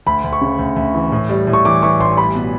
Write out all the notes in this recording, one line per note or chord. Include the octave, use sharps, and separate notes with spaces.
D2 B5
D2
C#6
C#3
D2
D2
E3
A2
G3
A2
C#6
E3 D6
E3 C#6
A1 C6
G3 B5
B2